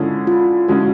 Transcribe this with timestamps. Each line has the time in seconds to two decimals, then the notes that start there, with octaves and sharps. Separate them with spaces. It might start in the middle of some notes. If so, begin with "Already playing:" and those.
Already playing: D3 F3 G#3 C#4 E4
0.27 F4
0.68 D3 F3 G#3 C#4 E4 F#4